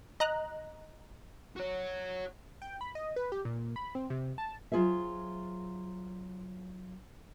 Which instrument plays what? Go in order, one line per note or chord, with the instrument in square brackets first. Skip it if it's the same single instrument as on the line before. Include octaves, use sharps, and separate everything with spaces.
[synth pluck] D#5 A#5 F#6
[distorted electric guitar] F#4 C#5
[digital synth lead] G5
B5
D#5
B4
G4
A#2
B5
C4
C3
A5
[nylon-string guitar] F#3 F4 G#4 C5 E5